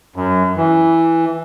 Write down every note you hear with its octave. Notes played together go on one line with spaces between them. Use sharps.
F#2
E3